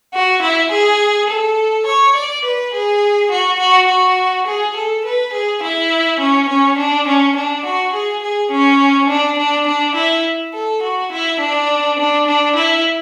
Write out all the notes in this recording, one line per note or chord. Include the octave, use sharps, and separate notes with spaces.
F#4
E4
G#4
A4
C#5
D5
B4
G#4
F#4
F#4
F#4
G#4
A4
B4
G#4
E4
C#4
C#4
D4
C#4
D4
F#4
G#4
G#4
C#4
D4
D4
D4
E4
A4
F#4
E4
D4
D4
D4
E4